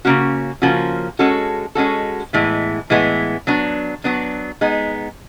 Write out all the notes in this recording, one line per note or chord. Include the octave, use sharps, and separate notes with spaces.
C#3 F3 A#3 C#4 F#4
C#3 F3 A#3 C#4 F#4
G#3 C#4 F#4 A4
G#3 C#4 F#4 A4
A2 E3 G#3 B3
A2 E3 G#3 B3
F#3 B3 D4
F#3 B3 D4
G#3 B3 D#4